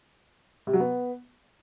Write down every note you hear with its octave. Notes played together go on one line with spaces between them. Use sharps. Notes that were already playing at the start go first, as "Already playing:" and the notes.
C3
F#3
B3